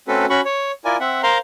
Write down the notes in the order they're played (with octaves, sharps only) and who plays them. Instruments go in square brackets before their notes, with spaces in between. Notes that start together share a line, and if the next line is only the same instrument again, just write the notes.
[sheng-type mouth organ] A3 C4 C#4 F#4 A4 B4
C#4 F#4 B5 C#6
C#5
E4 F4 A#4 D5 G#5
C4 E5 F#5
A#4 C5 F5 A#5 C6